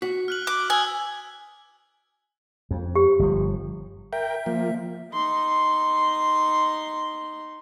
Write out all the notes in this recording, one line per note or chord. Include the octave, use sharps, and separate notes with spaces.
F#4 B6
F6 F#6 F#7
D6 F#6
G#5 D#6 E6 G#6
F2
G4
G1 F3
A#4 E5 G5
F3 A#3
D#4 C6